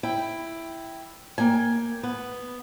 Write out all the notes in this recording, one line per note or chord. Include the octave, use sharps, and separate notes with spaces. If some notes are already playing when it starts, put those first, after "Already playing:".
E4 G5
A#3 G5 G#5
B3